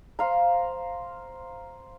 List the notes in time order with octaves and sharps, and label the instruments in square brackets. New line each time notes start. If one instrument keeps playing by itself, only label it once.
[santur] C5 F5 A#5